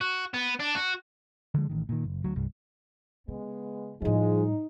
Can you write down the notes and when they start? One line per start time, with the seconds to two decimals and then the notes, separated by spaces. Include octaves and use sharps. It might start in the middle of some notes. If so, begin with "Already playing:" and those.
0.01 F#4
0.34 B3
0.60 D4
0.75 F#4
1.54 D3 F3 G#3
1.69 A1 D#3
1.89 A#2 D#3
2.04 F#1
2.24 D2 F#3
2.36 C2 G2
3.28 C#3 G#3 B3
4.02 A2 F3 G3 G#3 D#4